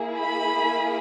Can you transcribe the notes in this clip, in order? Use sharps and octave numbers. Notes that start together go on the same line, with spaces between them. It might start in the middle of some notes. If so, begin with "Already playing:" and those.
Already playing: A#3 E4 G#4
B5